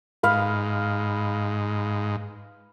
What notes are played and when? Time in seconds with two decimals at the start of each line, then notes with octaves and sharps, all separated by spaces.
0.23 G#2 B4 F5